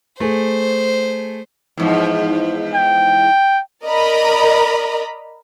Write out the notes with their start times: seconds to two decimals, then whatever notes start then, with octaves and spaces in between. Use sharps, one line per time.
0.20 A3 G#4 C5
1.77 E2 G#2 F3
2.75 G5
3.85 A#4 D5 D#5 A#5 B5